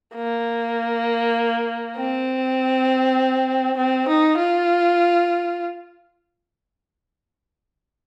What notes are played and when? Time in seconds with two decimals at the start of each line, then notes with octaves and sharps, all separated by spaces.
0.15 A#3
1.97 C4
3.77 C4
4.08 D#4
4.38 F4